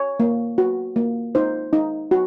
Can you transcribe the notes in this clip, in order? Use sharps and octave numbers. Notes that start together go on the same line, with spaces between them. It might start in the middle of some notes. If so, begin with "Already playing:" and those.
Already playing: C#5
A#3
F#4
A#3
D#4 C5
D#4
F#4